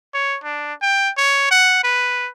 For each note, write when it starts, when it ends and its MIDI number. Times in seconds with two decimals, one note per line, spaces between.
0.14 0.38 73
0.44 0.73 62
0.82 1.10 79
1.17 1.46 73
1.51 1.82 78
1.84 2.29 71